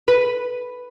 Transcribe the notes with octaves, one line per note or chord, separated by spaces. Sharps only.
B4